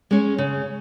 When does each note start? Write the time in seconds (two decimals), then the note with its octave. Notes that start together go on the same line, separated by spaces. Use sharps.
0.11 G#3 C#4
0.38 C#3